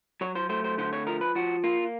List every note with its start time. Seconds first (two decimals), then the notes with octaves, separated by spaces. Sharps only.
0.21 F#3 C#5
0.35 C5
0.49 A3 C5
0.64 C5
0.78 D3 C5
0.93 C#5
1.07 F3 A#4
1.21 B4
1.35 F3 F#4
1.64 A#3 F4